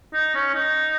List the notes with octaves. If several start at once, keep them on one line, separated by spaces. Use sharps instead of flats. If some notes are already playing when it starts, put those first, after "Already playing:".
D#4
C#4
D#4